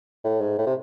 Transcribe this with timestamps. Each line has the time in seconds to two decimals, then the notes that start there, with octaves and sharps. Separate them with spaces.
0.24 A2
0.41 G#2
0.58 A2
0.67 C3